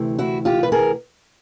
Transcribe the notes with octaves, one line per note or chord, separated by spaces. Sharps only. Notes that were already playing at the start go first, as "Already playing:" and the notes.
Already playing: D2 C3 E3 A3
E4 F#4
F4 G4
B4
G#4 A#4